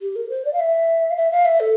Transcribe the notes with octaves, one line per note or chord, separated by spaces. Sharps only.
G4
A#4
C5
D5
F5
E5
F5
E5
F5
E5
A4